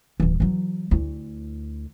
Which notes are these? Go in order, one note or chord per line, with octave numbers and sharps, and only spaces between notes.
D1 E3
E3 F#3
D2 E4